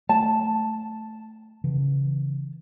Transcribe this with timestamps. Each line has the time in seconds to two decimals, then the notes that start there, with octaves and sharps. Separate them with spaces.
0.09 A3 A5
1.64 C#3 E3